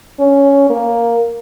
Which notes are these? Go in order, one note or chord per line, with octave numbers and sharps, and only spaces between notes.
C#4
A#3